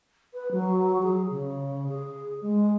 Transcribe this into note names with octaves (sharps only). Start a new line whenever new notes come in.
B4
F#3
G#4
C#3
G#4
G#3